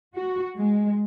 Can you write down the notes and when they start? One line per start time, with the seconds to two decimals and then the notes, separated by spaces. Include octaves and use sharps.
0.16 F#4
0.56 G#3